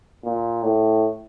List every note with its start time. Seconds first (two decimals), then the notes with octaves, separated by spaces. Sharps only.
0.24 A#2
0.64 A2